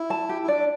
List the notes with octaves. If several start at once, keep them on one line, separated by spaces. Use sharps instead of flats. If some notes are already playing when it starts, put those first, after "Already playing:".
Already playing: E4
A5
G4
E4
D4 D5